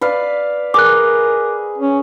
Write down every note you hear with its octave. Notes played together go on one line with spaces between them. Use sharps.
B4 D5 F5
G#4 A#4 D6 F#6
C#4